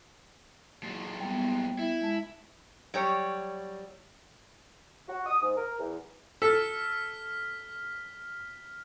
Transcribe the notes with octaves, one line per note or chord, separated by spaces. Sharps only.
A#2 F#3
G3 B3
E4
G#3 A5
F#3 G3 C#5
F#4
D#6
G#2
A#4
E2
A4 F6 B6